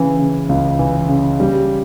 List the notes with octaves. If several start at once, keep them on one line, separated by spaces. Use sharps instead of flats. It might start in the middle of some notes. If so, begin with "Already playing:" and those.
Already playing: C#3 E3
C#3
C#2
E3
C#3
G3